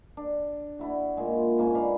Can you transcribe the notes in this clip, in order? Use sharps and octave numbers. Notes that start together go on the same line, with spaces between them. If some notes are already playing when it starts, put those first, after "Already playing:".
D4
D4 E4 F#4
A#2 G#3
G#2 A#3 C#4 G#5
D4 B4 F5